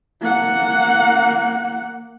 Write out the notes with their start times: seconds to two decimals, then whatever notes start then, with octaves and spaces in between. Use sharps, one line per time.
0.21 A#3 F#5